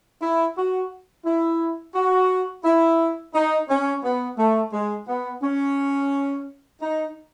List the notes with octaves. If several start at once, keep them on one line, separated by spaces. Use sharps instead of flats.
E4
F#4
E4
F#4
E4
D#4
C#4
B3
A3
G#3
B3
C#4
D#4